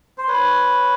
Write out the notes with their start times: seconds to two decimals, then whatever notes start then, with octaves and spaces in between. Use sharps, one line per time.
0.18 C5
0.28 B4 C#5